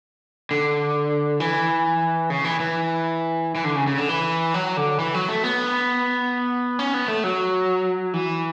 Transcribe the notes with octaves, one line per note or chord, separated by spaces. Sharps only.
D3
E3
C#3
E3
E3
E3
D3
C#3
C#3
D3
E3
F#3
D3
E3
F#3
A3
B3
C#4
B3
A3
F#3
E3